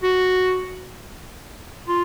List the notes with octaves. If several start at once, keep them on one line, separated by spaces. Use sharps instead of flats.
F#4
F4